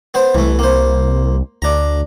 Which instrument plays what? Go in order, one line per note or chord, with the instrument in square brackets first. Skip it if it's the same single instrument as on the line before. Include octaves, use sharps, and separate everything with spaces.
[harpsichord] B3 C5
[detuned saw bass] C2 [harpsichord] E3 A3
[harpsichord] A#3 C5
[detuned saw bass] D2 [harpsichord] D4 A#5